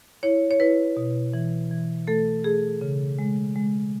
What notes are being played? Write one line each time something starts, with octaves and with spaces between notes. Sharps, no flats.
E4 C#5
C#5
E4 B4
B2
E3
E3
A3 A4
A3 G#4
C#3
G#3
G#3